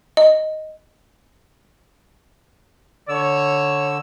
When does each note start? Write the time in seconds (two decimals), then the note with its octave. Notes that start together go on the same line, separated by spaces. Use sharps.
0.17 D#5
3.09 D3 C#5 E6